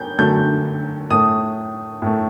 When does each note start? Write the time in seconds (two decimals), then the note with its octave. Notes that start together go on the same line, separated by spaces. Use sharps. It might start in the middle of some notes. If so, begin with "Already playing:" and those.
Already playing: G6
0.18 D3 F#3 A3 G6
1.10 A2 A3 D#6
2.02 A2 A3